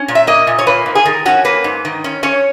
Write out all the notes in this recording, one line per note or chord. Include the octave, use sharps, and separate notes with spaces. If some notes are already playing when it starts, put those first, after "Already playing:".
Already playing: C#4
A#2
E5
A#3 D#5
A#2
C#5
A#3 B4
G#2
G#4
D#3 A#4
C#4 F#4
A#3 B4
G#2
D#3
C#4
C#4 C#5